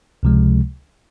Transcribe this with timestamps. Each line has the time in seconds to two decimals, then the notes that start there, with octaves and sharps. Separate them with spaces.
0.23 C#2 C3 F3 G#3